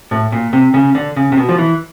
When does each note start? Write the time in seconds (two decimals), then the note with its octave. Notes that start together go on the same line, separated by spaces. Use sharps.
0.11 A2
0.32 A#2
0.53 C3
0.74 C#3
0.95 D3
1.16 C#3
1.32 C3
1.37 B2
1.49 F3
1.58 E3